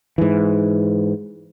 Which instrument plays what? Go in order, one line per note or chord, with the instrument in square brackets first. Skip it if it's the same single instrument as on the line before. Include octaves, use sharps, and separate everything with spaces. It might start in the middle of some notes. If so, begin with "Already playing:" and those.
[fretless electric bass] G#2 E3